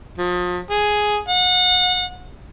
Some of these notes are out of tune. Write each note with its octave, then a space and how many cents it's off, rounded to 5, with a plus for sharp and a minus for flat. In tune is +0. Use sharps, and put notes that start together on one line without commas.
F3 +35
G#4 +5
F#5 -30